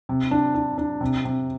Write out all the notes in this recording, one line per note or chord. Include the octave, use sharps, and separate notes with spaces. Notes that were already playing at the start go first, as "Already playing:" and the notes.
C3
D4
D4
D4
C3
C3